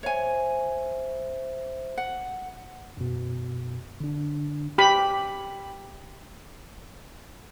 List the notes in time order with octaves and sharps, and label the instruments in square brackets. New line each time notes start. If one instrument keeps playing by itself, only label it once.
[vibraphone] C5 E5 [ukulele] C#5 G#5
[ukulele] F#5
[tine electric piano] F#2 B2
D3 D4
[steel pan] G4 B5